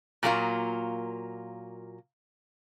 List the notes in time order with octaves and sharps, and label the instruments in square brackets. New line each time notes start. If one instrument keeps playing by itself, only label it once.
[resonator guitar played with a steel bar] A#2 F#3 A#3 F4